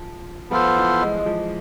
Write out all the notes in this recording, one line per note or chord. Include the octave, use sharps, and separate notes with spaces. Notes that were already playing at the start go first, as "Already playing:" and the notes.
Already playing: F3
F3 B3 F4 A4 C5
E3
G#3
G#3
F3